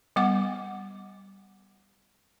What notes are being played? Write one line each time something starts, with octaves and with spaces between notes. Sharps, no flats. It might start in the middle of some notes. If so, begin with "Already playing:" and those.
G3 B3 F#5 D6